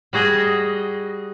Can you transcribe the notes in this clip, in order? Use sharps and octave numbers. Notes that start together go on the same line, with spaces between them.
G3 F#4 G#4 D#5